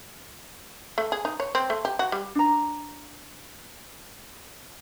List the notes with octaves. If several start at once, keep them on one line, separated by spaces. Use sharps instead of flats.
A3
G#4
D#4
C#5
C4
A3
G4
F#4
G3
D4 A#5